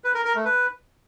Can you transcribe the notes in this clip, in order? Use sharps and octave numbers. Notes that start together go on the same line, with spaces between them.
B4
A#4
A#4
A3
B4